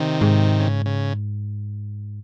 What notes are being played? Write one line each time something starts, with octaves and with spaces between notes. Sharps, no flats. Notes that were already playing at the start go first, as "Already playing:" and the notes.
Already playing: C3 D#3
G#2
C#3
C#3